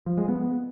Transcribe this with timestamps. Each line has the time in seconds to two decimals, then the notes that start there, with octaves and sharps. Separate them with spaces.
0.06 F3
0.17 G#3
0.28 B3